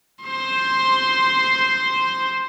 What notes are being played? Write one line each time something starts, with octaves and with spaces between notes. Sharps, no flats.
C5 C6